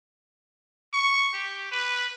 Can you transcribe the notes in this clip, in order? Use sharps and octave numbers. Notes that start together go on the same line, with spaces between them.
C#6
G4
B4